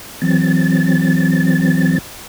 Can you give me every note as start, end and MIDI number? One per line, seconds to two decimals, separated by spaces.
0.22 1.98 52
0.22 1.98 54
0.22 1.98 60
0.22 1.98 93